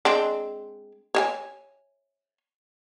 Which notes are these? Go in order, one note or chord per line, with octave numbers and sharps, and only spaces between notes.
G#3 C4 D4
C#5 E5 G#5